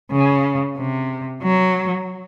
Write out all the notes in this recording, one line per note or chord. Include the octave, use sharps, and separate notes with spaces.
C#3
C3
F#3